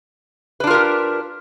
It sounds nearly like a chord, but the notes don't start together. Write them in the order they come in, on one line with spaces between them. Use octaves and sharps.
B4 D4 F4 A#4 G4